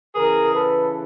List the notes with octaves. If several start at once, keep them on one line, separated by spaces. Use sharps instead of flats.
C#3 E3 G#4 A#4
A4 B4